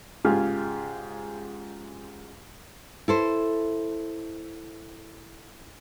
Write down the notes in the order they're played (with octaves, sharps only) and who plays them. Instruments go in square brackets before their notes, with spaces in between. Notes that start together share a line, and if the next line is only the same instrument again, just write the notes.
[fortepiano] G#2 C#3 F4 G4 G#4 F6
[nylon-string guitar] E4 A4 C5